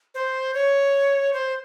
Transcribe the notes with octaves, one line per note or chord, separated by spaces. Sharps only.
C5
C#5
C5